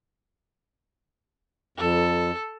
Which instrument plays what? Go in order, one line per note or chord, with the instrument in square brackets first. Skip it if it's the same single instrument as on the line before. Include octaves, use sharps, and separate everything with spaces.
[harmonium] F2 [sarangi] A4